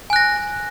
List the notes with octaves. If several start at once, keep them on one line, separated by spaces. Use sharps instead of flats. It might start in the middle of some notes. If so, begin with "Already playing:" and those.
G#5 F#6 A#6